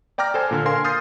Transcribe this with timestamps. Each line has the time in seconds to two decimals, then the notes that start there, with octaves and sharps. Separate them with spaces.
0.18 D5 G5 A#5 D6 F6 A#6
0.34 A4 C5 G#5
0.51 A#2 D3
0.66 A#4 F5 G#5 C6
0.85 D#6 F6 G6 A6 C7